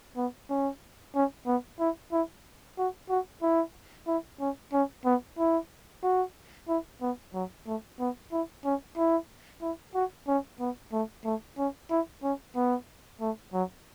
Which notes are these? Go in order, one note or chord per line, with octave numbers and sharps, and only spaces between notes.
B3
C#4
C#4
B3
E4
E4
F#4
F#4
E4
E4
C#4
C#4
B3
E4
F#4
E4
B3
F#3
A3
B3
E4
C#4
E4
E4
F#4
C#4
B3
A3
A3
C#4
E4
C#4
B3
A3
F#3